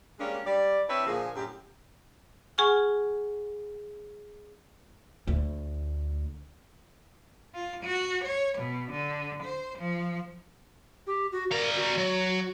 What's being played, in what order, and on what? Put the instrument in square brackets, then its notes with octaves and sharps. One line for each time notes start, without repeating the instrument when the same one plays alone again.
[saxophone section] G3 G#3 A#3 C#4 D4 G#4
G3 D5
C4 D4 E4 B4 C#5 E5
A#2 D3 F3 A#3 G#4
F#2 A2 G4
[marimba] G#4 F#5 G#5 C#6 F6
[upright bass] D2
[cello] F4
F#4
C#5
B2
D3
C5
F3
[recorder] G4
F#4
[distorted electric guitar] G3 A#5 [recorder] A#4
[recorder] F#4
[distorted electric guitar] F#3